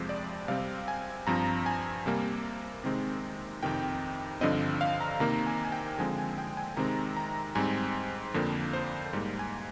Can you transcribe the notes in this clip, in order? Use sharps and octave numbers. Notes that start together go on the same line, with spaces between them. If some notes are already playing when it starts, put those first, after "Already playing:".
Already playing: F2 C3 F3 G#3 C4 C5
D5
C3 G3 C4 F5
G#5
G2 F3 C4 A#5
G#5
C3 G3 A#3
C3 D#3 G#3 C4
F2 C3 D#3 G5
G2 D3 F3 C4 D#5
F5
A#5
C3 D#3 A#3 A#5
G#5
G#5
G5
D3 F3 G#3 C4 G#5
G#5
G5
G#5
C3 D#3 G#3 C4 A#5
A#5
G#2 G3 C4 G#5
F2 D3 F3 A#3
C5
G#2 G3 A#3
G#5